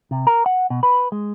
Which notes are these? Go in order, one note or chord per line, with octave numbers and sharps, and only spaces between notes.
C3
A#4
F#5
B2
B4
G#3